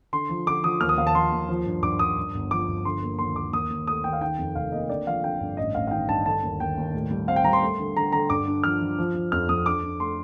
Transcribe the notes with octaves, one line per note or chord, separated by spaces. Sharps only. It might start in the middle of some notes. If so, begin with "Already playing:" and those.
D3 C6
F3
D3 D6
F3 D#6
D#2 F6
D#6
D#2 F5
A5
F3 C6
D#2
F3
G2
G2 D6
G2 D#6
G2
G1
F3 D6
G1
D3 C6
A#3
D#2 C6
A#3 D6
D#2 D#6
D#2
A3 D#6
D#2 G5
F5
D#3 G5
F2
F1 F5
A#3 D#5
D3 D5
F3 F5
D3 G5
G2
A1 D#5
A1 F5
F5
D#3 G5
G2 A5
D3 A5
D#2
D#2 G5
D#2
A2
G3
C4 F5
G5
G3 A#5
C6
A3
D3
D3 A#5
D3 A#5
G2 D6
D4
F3 F6
F3
F3
F3
F2 F6
F2 D#6
D4 D6
D4
A3 C6